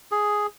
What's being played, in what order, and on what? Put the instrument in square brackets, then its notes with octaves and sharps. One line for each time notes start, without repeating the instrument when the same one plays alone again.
[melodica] G#4